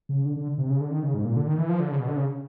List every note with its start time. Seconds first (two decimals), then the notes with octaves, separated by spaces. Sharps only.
0.09 C#3
0.25 D3
0.36 D3
0.58 C3
0.70 C#3
0.81 D3
0.92 D#3
1.03 C#3
1.14 G#2
1.25 A#2
1.36 D3
1.47 D#3
1.58 E3
1.69 F3
1.80 D3
1.91 C#3
2.00 B2
2.08 D3
2.17 C#3